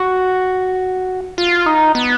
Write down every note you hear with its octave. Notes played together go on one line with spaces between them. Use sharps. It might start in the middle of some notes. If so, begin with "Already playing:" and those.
Already playing: F#4
F4
D#4
B3